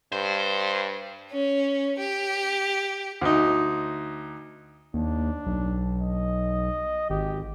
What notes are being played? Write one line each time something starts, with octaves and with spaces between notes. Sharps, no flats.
G2 C5
C#4
G4
D2 D#4
D#2 D4
B1
D#5
G#1 G4